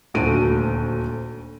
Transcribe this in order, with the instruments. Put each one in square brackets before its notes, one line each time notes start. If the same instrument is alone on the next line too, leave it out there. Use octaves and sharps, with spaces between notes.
[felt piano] D#1 D2 F#4 D7 D#7